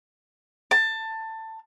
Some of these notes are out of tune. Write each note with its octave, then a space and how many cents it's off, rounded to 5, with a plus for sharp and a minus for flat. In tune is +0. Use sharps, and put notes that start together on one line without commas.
A5 +20